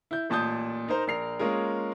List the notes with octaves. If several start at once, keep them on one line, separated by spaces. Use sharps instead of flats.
E4 G6
A1 A#2 A5 D#6 G6
D#4 A#4 C5
A#1 A#4 C7 F7
G#3 A#3 C#4 F4 G#4 A#4